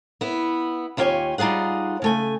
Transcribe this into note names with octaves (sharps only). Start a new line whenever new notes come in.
B3 E4
D#2 E4 F4 G4 C#5 G#5
G3 D#4 F4 G#4 F#5
C#3 A3 G#5